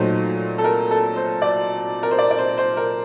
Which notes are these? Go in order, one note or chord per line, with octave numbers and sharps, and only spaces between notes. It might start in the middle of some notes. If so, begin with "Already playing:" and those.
Already playing: A#2 F#3 A3 D#4 C5
A4
A#4
A4
C5
D5
A#4
C5
D5
D5
C5
C5
A#4